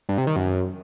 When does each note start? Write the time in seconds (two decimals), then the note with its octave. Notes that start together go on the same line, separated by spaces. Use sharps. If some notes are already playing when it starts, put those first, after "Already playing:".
0.09 G2
0.18 C3
0.27 D#3
0.36 F#2